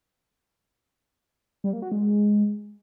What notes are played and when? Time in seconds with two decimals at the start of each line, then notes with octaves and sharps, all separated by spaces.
1.64 G3
1.73 A#3
1.82 F#4
1.92 G#3